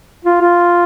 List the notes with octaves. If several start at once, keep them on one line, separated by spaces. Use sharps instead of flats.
F4
F4